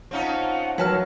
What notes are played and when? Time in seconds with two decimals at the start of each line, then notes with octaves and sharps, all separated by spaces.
0.11 C4 C#4 D#4 F4 F#5 A5
0.78 F#3 E4 F#4 A#4 B4 A5 F6